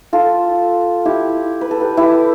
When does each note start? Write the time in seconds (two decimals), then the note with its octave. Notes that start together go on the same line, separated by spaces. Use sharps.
0.13 F4 A4
1.05 E4 G4
1.61 B4
1.71 A4
1.80 G4 B4
1.97 E4 G4